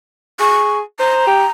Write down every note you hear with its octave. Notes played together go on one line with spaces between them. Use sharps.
G#4 C#6
C5 A#5
G4